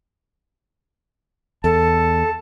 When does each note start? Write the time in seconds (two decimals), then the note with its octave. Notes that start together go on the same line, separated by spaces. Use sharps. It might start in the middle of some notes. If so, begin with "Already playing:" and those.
1.64 E2 A4 A5